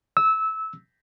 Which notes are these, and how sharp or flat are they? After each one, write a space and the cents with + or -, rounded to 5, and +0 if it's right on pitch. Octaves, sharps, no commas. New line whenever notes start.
E6 -20